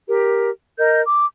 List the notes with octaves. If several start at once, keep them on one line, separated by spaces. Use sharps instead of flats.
G4 A#4
A#4 D#5 G6
D6